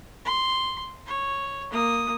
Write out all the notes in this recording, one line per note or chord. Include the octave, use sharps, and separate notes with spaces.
C6
C#5
A#3 D#6